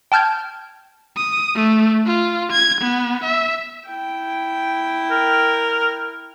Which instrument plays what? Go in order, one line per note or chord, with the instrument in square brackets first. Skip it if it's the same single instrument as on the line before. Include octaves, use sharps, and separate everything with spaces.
[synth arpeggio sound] G5 A5 F6 G6 G#6
[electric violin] D#6
A3
F4
G#6
B3
E5
[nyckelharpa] E4 G5
[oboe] A#4